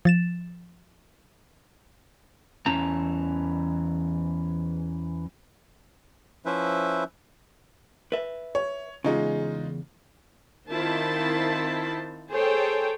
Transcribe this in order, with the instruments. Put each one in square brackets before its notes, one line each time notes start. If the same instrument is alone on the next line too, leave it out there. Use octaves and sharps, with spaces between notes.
[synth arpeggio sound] F3 A6 E7
[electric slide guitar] E2 E3 C#4 A5 A#5
[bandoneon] F3 C#4 E4 B4 C5 E5
[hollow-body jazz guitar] B4 E5
[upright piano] C#5
[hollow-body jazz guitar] E2 C#3 [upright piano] G#3 D#4 F4
[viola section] D#3 C4 E4 F4 C5 A5
G#4 A4 C5 C#5 G5 A5